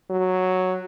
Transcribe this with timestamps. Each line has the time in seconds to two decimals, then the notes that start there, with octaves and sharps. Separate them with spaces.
0.10 F#3